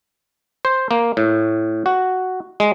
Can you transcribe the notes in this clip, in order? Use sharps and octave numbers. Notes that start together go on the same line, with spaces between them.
C5
A#3
A2
F#4
G#3